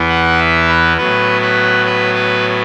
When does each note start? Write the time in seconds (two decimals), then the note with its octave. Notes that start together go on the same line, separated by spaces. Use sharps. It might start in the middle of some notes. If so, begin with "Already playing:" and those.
Already playing: E2 E3 B3
0.09 F#5
0.39 E5
0.69 B4
0.97 A2 F#3 B3 B4
1.42 B4
1.86 B4
2.15 B4